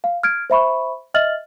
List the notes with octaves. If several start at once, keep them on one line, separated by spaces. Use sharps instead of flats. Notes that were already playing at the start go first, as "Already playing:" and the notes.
F5
F6 G#6 D7
C5 E5 B5 C#6
D#5 E5 F6 A6 F#7